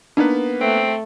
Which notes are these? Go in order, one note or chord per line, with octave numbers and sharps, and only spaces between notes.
A#3 B3 D4 D#4 B4
A3 C4